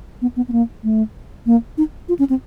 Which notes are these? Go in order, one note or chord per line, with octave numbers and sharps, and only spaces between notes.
B3
B3
B3
A#3
A3
A#3
D#4
F4
C#4
C4